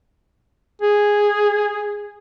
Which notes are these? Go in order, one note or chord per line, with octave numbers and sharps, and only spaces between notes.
G#4